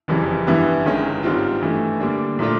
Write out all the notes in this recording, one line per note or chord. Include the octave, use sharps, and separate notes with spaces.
F#1 F2 C#3 E3 G3
G2 E3 G3 B3 E4
G1 G2 D#3 G#3 C#4
G#2 D#3 G3 C4 F4
G2 E3 A3
D3 G3 A#3 D4
A#2 F3 A3 D4 F4